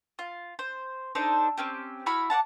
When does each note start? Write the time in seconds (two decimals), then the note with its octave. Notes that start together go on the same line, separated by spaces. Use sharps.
0.19 F4
0.59 C5
1.15 D4 D#4 A4 C5
1.58 C4 C#4 G4
2.06 E4 F#4 B5 F6
2.30 D5 F5 F#5 A5